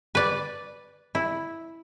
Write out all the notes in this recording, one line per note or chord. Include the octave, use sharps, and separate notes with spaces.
B4 D5
E4